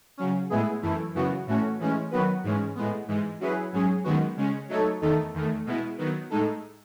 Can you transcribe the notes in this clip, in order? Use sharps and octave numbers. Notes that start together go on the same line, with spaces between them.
C#3 F#3 C#4
A2 G#3 B3 E4 G#4
F#2 E3 A3 E4
F#2 C#3 E3 B3 F#4
A2 E3 A3 C#4 F#4
A2 E3 G#3 C#4
D#3 F#3 B3 F#4 B4
G#2 E3 G#3 C#4
A2 G#3 B3
G#2 E3 G#3
F#3 C#4 E4 G#4 B4
G#2 F#3 C#4 G#4
F#2 D#3 G#3 B3 F#4
C#3 G#3 C#4
F#3 A3 D#4 A4 C#5
E2 D#3 A3 D#4 A4
E2 D#3 A3
B2 G#3 B3 E4
D#3 F#3 B3
A2 G#3 D#4 A4